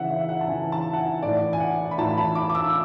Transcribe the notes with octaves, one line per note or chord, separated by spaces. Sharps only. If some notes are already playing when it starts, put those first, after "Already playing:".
Already playing: C#3 E3 E5 F#5
E5
F#5
A5
C#3 E3 G#5
A5
F#5
G#5
A2 E3 D5
G#5
F#5
B5
A2 E3 A5
B5
D6
D6
E6